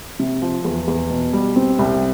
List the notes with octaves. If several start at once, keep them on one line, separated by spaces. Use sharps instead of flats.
C3
F3
E2
E2
B2
G3
C4
C2